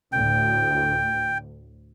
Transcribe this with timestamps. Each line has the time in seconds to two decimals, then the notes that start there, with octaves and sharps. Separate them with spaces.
0.12 D2 A2 G5